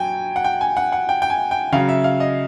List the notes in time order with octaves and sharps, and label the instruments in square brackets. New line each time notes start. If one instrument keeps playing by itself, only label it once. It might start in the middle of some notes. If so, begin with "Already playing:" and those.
Already playing: [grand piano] F#3 G5 G#5
F#5
G5
G#5
F#5
F#5
G5
G5
G#5
G5
C#3 F5
F#3
E5
F5
D#5